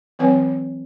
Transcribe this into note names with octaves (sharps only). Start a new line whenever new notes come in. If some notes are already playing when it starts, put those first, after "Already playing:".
E3 F#3 C4 B4 C#5 G#5